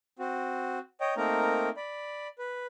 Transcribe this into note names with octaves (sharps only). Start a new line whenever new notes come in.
C4 F#4
C#5 D#5 G5
A3 A#3 C4 D#4 A#4 A#5
D5 B5
B4